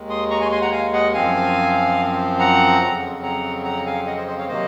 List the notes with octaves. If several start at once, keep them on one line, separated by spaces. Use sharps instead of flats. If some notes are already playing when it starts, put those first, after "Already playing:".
Already playing: D#2 D#3 G#3
C6 D#6
A#5 C#6
G#5 C6
G#5 C6
F#5 A#5
F5 G#5
D#5 F#5
F#2 F3 C4 F5 G#5
F#5 A#5
F2 C#3 F#3 C4
F#5 A#5
F#5 A#5
F5 G#5
D#5 F#5
C5 D#5
C5 D#5
C#5 F5
C3 D#3 F#3 A#3 C5 D#5